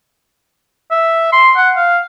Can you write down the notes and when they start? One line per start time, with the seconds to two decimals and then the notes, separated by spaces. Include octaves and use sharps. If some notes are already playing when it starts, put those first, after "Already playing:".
0.91 E5
1.33 C6
1.57 F#5
1.77 F5